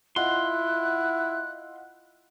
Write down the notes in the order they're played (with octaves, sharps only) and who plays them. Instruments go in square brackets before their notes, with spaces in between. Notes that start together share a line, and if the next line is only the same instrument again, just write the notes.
[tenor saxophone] E4 [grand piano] F4 D#5 F#5 [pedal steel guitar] C6 [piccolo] F#6